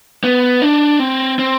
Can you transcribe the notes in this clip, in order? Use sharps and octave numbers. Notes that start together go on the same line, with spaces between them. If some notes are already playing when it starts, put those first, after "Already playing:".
B3
D4
C4
C4